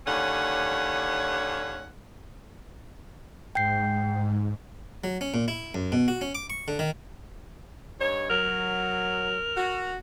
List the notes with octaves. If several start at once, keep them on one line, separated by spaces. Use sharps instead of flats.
D#2 D3 C#4 C#5 F#5
G#2 G5 G6 C7
F#3
C#4
A#2
E4
F#2
B2
F#4
C#4
D6
C#6
D3
D#3
G2 D#4 C#5
F#3 A#4
F#4